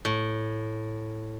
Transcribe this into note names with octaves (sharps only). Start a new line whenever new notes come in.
A2